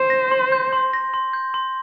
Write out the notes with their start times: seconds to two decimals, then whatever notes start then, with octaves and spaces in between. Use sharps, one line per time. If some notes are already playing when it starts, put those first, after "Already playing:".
Already playing: C5
0.10 A#6
0.31 C6
0.52 G6
0.73 C6
0.93 A#6
1.14 C6
1.33 G6
1.54 C6